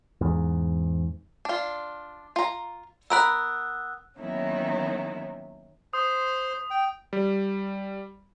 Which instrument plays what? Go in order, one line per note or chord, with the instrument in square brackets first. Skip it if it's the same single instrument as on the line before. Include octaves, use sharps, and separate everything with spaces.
[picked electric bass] E2 G#2
[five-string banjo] D4 F4
F4 A#5
[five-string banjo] B3 A#4 B5 [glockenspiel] E6 F#6
[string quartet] D#3 F#3 A#3 B3 C#4 E4
[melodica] C5 C6 [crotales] D#6
[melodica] G5
[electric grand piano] G3